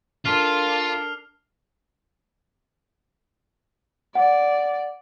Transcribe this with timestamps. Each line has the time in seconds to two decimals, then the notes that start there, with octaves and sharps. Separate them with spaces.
0.25 D4 F4 A4 A#4 F6 C7 F7
4.15 D5 F#5